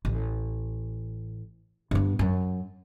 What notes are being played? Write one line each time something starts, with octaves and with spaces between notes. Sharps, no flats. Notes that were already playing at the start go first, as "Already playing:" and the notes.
A1
G2 B3
F#2